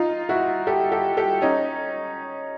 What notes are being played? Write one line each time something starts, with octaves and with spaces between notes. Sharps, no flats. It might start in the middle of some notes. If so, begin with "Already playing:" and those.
Already playing: D#4 F4
E4 F#4
G4 A4
G4 A4
G4 A4
C#4 D#4